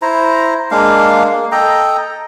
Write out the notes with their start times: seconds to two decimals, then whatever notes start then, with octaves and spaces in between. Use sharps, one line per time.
0.02 E4 C5 A#5
0.71 G#3 A#3 D4 F5
1.24 A#3
1.52 A4 D#5 G5 A#5